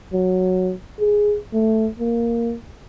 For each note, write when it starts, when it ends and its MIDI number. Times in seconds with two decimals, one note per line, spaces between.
0.13 0.73 54
1.00 1.37 68
1.53 1.89 57
2.00 2.55 58